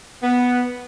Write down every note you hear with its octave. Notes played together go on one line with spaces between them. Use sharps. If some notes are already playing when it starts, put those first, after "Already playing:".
B3